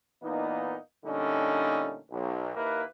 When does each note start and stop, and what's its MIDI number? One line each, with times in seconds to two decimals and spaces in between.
0.22 0.76 46
0.22 0.76 52
0.22 0.76 58
0.22 0.76 59
0.22 0.76 63
1.05 1.98 46
1.05 1.98 50
1.05 1.98 55
1.05 1.98 57
1.05 1.98 61
1.05 1.98 63
2.10 2.52 35
2.55 2.82 39
2.55 2.82 58
2.55 2.82 64
2.55 2.82 71